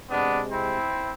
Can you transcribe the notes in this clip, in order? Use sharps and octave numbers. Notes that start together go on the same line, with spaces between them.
C3 G#3 B3 D4
C4 E4